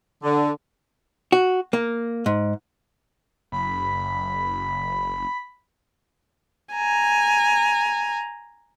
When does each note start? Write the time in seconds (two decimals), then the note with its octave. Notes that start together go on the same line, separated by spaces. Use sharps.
0.23 D3
1.32 F#4
1.73 A#3
2.26 G#2
3.52 F#1 B5
6.74 G#5 A#5